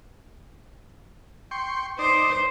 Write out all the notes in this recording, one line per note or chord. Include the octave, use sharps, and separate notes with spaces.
G5 C6 C#6
D#4 C5 D5